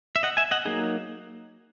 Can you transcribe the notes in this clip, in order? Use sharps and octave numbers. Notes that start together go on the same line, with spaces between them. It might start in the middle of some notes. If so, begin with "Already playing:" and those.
E5
D#5 F#5
E5 G#5
D#5 F#5
F#3 A#3 D#4 G#4